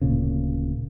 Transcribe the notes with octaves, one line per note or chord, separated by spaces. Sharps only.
D1 A#2 C#3